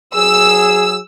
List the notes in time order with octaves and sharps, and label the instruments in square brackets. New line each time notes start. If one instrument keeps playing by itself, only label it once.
[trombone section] F#3 G#4 [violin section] E6